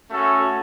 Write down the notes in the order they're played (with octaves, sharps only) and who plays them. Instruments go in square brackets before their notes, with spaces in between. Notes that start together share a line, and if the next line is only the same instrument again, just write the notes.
[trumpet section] A3 C#4 F#4 A4